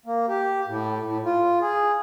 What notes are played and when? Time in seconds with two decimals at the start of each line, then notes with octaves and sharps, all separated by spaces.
0.06 A#3
0.28 G4
0.68 A2
1.04 A2
1.25 F4
1.61 G#4